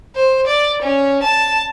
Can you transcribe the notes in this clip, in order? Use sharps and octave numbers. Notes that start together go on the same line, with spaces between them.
C5
D5
C#4
A5